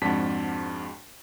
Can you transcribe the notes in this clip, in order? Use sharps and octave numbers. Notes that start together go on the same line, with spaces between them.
F2 G#2 D4 F#4 A5 B6